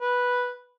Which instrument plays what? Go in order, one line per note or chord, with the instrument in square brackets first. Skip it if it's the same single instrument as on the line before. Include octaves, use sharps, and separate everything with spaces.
[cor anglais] B4